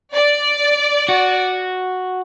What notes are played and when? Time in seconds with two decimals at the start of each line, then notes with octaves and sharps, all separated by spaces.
0.14 D5
1.09 F#4